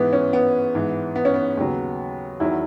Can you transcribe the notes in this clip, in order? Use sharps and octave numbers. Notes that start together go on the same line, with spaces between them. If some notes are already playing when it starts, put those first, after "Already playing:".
Already playing: G#2 E3 B3
C#4
B3
G#2 E3
B3
C#4
B3
D#2 C#3 F#3
E2 D#3 F#3 E4